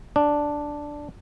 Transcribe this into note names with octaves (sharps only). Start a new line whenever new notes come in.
D4